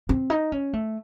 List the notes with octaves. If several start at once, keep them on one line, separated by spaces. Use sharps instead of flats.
C4
D#4
C#4
A3